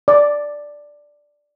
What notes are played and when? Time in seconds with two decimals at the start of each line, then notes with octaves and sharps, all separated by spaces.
0.08 D5